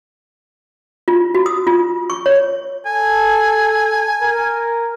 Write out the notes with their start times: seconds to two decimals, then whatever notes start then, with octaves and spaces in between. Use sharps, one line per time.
1.08 F4
1.35 F#4
1.46 D#6
1.67 F4
2.10 C#6
2.26 C#5
2.86 A4 G#5
4.22 A#4